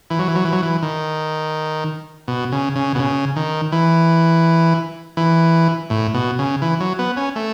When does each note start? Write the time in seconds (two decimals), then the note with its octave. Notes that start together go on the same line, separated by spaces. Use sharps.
0.10 E3
0.19 F#3
0.28 E3
0.36 F#3
0.45 E3
0.53 F#3
0.62 E3
0.82 D#3
2.28 B2
2.52 C#3
2.76 C#3
2.95 B2
3.00 C#3
3.36 D#3
3.72 E3
5.17 E3
5.90 A2
6.14 B2
6.39 C#3
6.62 E3
6.80 F#3
6.99 B3
7.17 C#4
7.36 A3